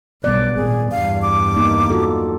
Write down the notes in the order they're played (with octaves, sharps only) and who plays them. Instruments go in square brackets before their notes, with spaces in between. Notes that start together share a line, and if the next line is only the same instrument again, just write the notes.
[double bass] B1 [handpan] G3 B3 D5 [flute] F#6
[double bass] G#1 A#2 [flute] G#4
[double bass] E2 G2 [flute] F5
[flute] D6
[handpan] A#3 D#4
F4 F#4 A4